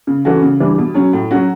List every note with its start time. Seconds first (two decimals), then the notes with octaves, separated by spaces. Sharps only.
0.07 C#3
0.25 E3 A3 C#4 F#4
0.42 C#3
0.60 E3 G3 D4
0.78 B2
0.94 F#3 C#4
1.13 A2
1.31 F#3 C#4 F#4